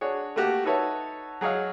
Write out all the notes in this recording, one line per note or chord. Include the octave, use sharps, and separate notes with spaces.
D4 F#4 G#4 C#5
A3 A#3 F#4 G4
D#4 F#4 A4 B4 C#5 E5
F#3 G#4 C#5 D#5 F5